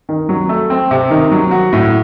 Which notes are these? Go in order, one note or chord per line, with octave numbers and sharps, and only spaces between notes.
D#3
F#3
A3
C4
C3
D#3
F#3
F#4
A2